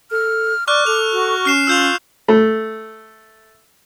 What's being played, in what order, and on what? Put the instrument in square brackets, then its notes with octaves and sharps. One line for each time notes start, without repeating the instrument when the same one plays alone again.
[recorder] A4 [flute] F6
[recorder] D5 [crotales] C#6 F6 F#6 [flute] D6
[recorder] A4 [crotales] F7
[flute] F#4
[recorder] C#4 [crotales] F6 C7 E7
[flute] F4 [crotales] E6 G6 F7
[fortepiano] A3